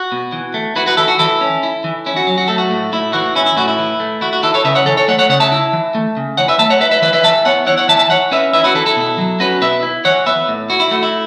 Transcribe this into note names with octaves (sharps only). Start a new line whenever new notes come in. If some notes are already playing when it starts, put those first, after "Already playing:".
Already playing: F#4
B2
E3
A3
E4 F#4 B4
F#4 B4
E3 E4 A4
F#4
E3 E4 A4
C#4
E4
E3
C#4 E4
F#4
F#3
F#4
A3 A4
F#4
A2
A2 E4
E3 F#4
C#4 E4
E4
A2 F#4
E4
E3
A3
E4 F#4
F#4
E3 E4 A4
A4 C#5
C#3 B4 E5
C#5 F#5
E3 A4 C#5
A4 C#5
A3 C#5 F#5
C#5 F#5
C#3 C#5 F#5
E5 A5
E4
E3
A3
C#3
E3 C#5 F#5
B4 E5
A3 E5 A5
C#5 F#5
E4 B4 E5
B4 E5
E3 B4 E5
B4 E5
E3 E5 A5
B3 C#5 F#5
E4 C#5 F#5
C#5 F#5
E3 E5 A5
E5 A5
E3 C#5 F#5
C#4 B4 E5
E4 B4 E5
F#4 B4
E3 E4 A4
E4 A4
B2
F#3
C#4 F#4 B4
B2 B4 E5
E4
E3 C#5 F#5
B3 B4 E5
A2
E4 F#4
E4
A3 F#4
E4